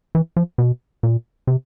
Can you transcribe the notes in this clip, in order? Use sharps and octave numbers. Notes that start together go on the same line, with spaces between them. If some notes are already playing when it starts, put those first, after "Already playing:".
E3
F3
B2
A#2
C3